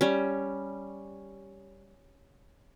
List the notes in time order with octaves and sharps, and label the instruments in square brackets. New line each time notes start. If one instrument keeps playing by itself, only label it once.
[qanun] G3 C#4